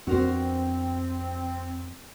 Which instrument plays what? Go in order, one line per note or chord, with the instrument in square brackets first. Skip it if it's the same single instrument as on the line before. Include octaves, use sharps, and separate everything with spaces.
[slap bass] F2 B3 D4 [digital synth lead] C4 [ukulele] F#4 A#4 C5